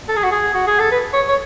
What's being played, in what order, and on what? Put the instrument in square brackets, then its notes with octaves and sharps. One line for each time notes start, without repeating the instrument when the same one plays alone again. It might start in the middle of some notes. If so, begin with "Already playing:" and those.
[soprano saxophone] A4
G#4
F#4
G#4
F#4
G#4
A4
B4
C#5
C#5